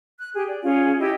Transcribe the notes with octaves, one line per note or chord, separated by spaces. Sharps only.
F#6
G4 G#4
D5
C#4 F4 G#4
E4 G4 D#5